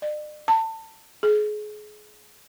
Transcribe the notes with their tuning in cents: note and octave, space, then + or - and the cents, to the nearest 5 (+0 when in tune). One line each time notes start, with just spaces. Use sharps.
D5 +45
A5 +25
G#4 +30